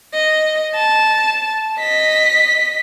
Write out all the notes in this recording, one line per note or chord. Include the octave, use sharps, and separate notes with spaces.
D#5
A5
D#5 B6